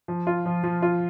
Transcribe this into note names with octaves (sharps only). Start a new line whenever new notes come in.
F3
F4
F3
F3
F4